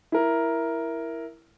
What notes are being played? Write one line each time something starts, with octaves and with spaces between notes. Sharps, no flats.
E4 A#4